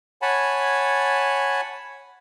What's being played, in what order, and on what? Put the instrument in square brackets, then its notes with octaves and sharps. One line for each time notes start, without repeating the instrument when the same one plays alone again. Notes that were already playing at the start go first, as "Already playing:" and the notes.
[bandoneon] C#5 F#5 G#5 A5 B5